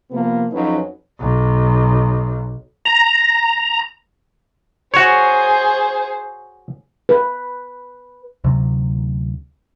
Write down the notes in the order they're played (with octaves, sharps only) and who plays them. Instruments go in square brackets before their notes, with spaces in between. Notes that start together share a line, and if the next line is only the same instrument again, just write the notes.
[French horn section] C3 F3 A#3 B3
F2 F#3 C#4 D#4 B4 C#5
[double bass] B1
[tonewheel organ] A#5
[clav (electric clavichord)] F#4 C#5 [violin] G#4 C5
[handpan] B4
[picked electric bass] D2 C3 F#3